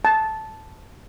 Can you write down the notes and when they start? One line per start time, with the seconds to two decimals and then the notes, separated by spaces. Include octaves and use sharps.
0.05 A5